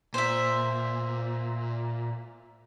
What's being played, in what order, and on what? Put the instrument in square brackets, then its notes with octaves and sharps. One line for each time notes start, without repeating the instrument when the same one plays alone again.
[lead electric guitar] A#2 [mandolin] C5 E5